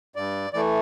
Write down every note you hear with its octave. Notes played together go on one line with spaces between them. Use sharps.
G2 D5
E3 A3 D5